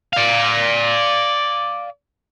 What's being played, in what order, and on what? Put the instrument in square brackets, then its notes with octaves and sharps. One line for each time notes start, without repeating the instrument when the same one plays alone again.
[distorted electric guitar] D5 F5